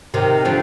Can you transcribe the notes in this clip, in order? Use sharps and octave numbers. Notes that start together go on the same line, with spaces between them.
C3 D#3
D3 F3